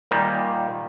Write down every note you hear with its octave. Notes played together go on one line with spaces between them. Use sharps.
A#2 D#3 G3 A#3